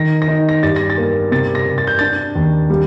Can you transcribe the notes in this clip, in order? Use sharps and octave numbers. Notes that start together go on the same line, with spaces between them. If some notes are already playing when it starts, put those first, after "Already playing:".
Already playing: D#3 A#6
A#6
D#4
A#6
G2 A6
A#6
A6
A#3
C3 A6
A#6
C3
A6
G6
D4 A6
D#2
G3